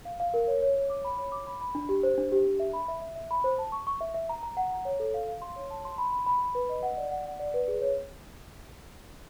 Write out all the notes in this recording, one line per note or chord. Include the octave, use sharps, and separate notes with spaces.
F5
F5
A#4
C#5
C#5
C#5
D6
B5
C#5
D6
B5
B5
D4
G4
C5
D4
G4
D4
E5
B5
E5
E5
E5
B5
C5
A5
C#6
C#6
E5
E5
A#5
A#5
F#5
A#5
C#5
A4
F5
F5
C6
C#5
A5
C6
B5
B5
B5
B5
B4
D#5
F#5
D5
F#5
F#5
D5
B4
G#4
C#5